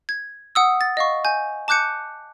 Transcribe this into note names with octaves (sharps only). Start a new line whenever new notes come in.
G#6
F#5 D#6 E6
A6
D#5 F5 C#6
G#5 G6
A5 D6 F#6 G6 C#7